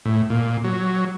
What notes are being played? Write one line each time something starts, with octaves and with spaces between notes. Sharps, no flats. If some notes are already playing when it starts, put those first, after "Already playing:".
A2
A#2
F#3